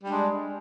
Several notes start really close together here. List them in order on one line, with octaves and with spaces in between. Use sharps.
G3 D4 G#3